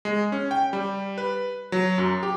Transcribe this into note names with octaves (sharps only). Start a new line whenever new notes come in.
G#3
C#4
G5
G3
B4
F#3
F#2
G4